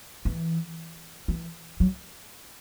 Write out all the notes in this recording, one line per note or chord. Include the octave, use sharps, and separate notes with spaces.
E3
E3
F#3